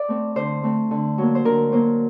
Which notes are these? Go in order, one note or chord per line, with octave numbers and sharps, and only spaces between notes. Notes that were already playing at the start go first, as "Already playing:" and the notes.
Already playing: D5
A3 C4
D3 C5
A3 C4
D3
F#3 A#3
C5
D3 A#4
F#3 A#3 C5